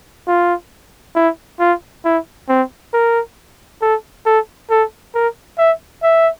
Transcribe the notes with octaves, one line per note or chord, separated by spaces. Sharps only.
F4
E4
F4
E4
C4
A#4
A4
A4
A4
A#4
E5
E5